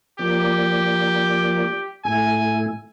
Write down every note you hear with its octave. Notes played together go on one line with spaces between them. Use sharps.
F3 A#3 G4 D5
A2 A3 E4 G#5